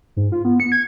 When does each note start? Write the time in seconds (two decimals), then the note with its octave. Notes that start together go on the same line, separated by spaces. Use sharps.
0.16 G#2
0.32 F4
0.45 B3
0.60 C#7
0.72 G#6